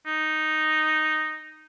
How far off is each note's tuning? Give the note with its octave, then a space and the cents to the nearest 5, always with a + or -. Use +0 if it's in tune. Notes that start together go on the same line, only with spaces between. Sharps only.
D#4 -5